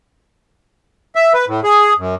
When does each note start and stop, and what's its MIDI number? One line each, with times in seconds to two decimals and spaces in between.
1.15 1.33 76
1.34 1.45 71
1.47 1.60 45
1.64 1.94 68
1.98 2.15 42